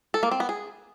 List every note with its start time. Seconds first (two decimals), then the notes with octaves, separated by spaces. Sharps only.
0.14 A4
0.23 A#3
0.31 C4
0.40 B3
0.49 G#4